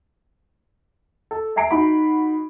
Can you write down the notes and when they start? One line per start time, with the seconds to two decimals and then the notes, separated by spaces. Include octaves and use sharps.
1.31 A4
1.56 E5 G#5 A#5 C7 D7
1.71 D#4 F#4 B5